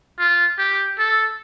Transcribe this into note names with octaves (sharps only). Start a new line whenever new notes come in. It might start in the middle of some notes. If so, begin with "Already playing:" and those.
F4
G4
A4